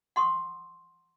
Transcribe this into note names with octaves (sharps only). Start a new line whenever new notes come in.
F#5 C6 C#6 D#6